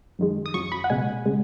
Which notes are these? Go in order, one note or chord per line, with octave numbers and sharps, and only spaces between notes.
F#2 D#3 G#3
D#6
F#2 F#3 C#6
B5
F#5
C#2 B2 G#3 G#5
C#3 G#3